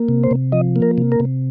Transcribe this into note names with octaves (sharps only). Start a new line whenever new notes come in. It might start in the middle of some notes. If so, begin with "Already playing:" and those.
Already playing: A#3
C3
C5
C3
F3 D#5
A#3
A#4
C3
A#4
C3